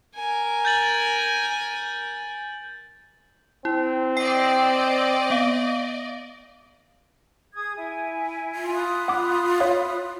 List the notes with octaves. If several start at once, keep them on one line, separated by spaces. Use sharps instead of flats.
A#4 G#5
G6 A6 F#7
C4 E4
D5 D#5 G5 C7
B3 F5
G#4 D#6 G#6
E4 G#5
F4
B5 D#6 F#6
F#5 D6
C#5 F5